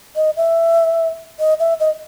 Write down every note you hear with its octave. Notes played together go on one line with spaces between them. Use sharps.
D#5
E5
D#5
E5
D#5